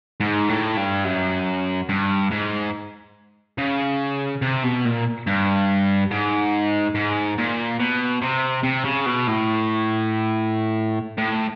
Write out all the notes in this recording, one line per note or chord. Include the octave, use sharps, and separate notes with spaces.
G#2
A2
G2
F#2
G2
G#2
C#3
C3
B2
A#2
G2
G#2
G#2
A#2
B2
C3
C3
C#3
B2
A2
A2